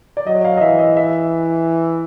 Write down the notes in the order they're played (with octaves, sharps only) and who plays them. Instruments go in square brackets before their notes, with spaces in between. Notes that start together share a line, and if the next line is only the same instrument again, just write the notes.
[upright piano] D5
[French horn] F#3 [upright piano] D#5
[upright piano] F5
D#5
[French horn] E3 [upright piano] E5
[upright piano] D#5
E5